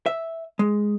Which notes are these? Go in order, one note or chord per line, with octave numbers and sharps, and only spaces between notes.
E5
G#3